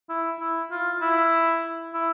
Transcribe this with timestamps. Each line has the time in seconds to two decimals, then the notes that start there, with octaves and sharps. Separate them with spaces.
0.10 E4
0.40 E4
0.71 F4
1.02 E4
1.94 E4